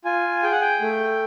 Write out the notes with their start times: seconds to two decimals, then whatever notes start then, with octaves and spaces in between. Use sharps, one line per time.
0.05 F4 G#5
0.43 G#4 G5
0.52 F#5
0.61 G5
0.81 A3